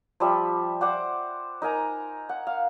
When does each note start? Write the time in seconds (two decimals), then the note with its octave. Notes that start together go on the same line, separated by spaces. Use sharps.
0.20 F3 G3 E5
0.81 C5 D5 F#5 D6
1.62 D#4 A#4 G#5 A#5
2.29 F#5
2.47 F5